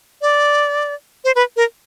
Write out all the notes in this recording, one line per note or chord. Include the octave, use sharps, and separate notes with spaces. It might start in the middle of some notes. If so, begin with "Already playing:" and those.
D5
C5
B4
A#4